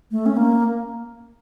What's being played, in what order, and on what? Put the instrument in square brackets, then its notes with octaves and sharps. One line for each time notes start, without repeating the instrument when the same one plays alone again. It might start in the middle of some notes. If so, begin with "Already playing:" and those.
[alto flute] A3
C#4
A#3